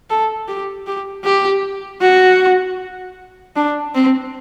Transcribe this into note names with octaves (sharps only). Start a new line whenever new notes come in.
A4
G4
G4
G4
F#4
D4
C4